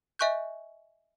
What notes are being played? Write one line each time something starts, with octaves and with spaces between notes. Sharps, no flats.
D#5 E5 G#5 C#6 F#6 G6